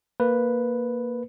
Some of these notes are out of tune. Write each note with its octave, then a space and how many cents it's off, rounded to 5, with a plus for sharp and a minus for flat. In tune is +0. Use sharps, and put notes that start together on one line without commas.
A#3 +0 B4 +0